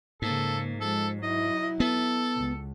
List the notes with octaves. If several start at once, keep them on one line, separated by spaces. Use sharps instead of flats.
G#2 C#3 A#3 A4
F3 G#3 A4
F#3 E4 D#5
B3 A4
C#2